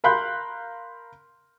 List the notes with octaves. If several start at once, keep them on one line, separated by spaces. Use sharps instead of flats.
A#4 F5 B5 C6 F#6 G6